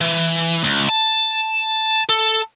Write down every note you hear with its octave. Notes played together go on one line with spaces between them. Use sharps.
E3
C#2
A5
A4